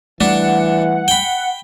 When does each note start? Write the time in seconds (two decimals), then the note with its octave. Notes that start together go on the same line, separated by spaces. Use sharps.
0.21 E3 G3 A3 D4 F#5
1.08 G5 B5